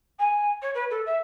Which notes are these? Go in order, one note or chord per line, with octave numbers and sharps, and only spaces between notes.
G#5
C#5
B4
A4
E5